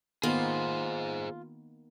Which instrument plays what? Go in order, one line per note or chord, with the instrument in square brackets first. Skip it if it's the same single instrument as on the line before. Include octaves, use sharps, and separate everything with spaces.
[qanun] D#3 A#3 B3 [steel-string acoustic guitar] F4 [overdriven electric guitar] G#4 C5